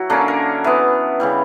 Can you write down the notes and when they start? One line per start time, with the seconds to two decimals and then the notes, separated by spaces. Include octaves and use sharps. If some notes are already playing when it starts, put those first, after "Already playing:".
Already playing: F#3 E4 F#4
0.10 D3 A#3 C#4 D4
0.28 A#4
0.64 E3 B3
1.20 C#3 E3 G3